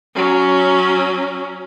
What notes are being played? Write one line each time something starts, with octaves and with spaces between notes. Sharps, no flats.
F#3 C#4